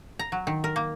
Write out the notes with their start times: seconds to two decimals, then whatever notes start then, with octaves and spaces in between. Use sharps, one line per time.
0.19 A#5
0.32 F#3
0.47 D#3
0.64 A#4
0.76 A#3